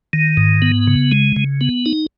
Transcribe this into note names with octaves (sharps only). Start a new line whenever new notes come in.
D#3
G#2
B3
C#3
G#3
C#3
B3
D#4